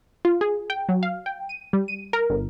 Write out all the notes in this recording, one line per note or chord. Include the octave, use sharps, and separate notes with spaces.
F4
G#4
G5
F#3
F5
G5
D#7
G3
D#7
A#4
G1